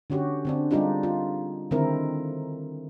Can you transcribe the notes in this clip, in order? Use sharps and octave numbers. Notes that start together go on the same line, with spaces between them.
D3 C#4 F#4 G4
D3 C4 D4
G3 G#3 D4 D#4 F4 G4
F4
D3 D#3 G#3 C4 E4 A#4